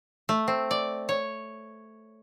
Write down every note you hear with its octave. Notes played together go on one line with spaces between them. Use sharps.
A3
C4
D5
C#5